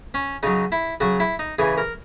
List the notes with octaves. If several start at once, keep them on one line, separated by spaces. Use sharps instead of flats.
C#4
C#3 F#3 D#4
E4
C#3 F#3 F#4
E4
D#4
C#3 E3 G#4
A#4